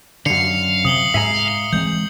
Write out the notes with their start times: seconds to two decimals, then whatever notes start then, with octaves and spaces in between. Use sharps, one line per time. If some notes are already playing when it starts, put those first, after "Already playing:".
0.26 F#2 D3 F5 C#7
0.85 C3 D#6 F#7 G7
1.14 G#2 E5 G#5 A#5 C7
1.73 E3 G#3 C4 G6